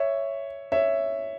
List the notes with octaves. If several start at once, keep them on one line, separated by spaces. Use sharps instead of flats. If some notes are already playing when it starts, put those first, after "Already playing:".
Already playing: C#5 E5
C#5 E5